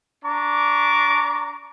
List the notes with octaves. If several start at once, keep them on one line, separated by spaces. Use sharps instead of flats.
D4 A#5 C#6 D6